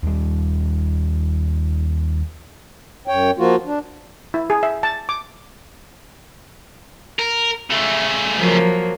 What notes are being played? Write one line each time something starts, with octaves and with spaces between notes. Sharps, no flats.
D#2 G3
F#2 C#5 G5
F3 A#3 F4 F#4
D4
E4
G#4
E5
A5
D6
A#4
C#3 A3
F3 F#3 A#3